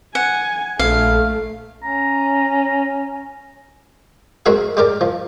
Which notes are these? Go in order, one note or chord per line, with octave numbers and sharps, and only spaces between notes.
F#5 G#5
A#1 A3 F5
C#4 A#5
G#3 C4 F#4 A#4 E5 F5
G#3 G4 A#4 D5
F3